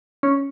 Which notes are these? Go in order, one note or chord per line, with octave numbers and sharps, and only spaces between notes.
C#4